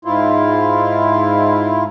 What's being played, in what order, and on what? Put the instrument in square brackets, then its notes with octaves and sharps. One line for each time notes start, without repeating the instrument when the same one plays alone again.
[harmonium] G#2 E4 F4